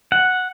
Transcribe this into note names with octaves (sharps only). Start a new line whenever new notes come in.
F#5